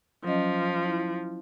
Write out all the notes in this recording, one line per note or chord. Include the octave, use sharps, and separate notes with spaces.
F3 F#3 C#4 D#5
E4